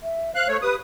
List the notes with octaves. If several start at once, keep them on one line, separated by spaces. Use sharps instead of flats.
E5
C5 F5 F#6
A3 C#5
G4 B4 D#6